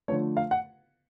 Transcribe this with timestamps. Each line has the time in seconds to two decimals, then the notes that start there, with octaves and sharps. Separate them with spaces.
0.08 D3 F3 A3 C#5
0.37 F5
0.51 F#5